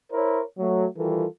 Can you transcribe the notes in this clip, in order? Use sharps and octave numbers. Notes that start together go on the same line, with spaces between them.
E4 A#4 C5 C#5
F#3 A3
D#3 E3 G3 F4 A4 A#4